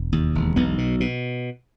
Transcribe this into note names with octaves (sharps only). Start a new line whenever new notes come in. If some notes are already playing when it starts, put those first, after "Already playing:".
Already playing: E1
D#2
E1
B1 B3
B2
B2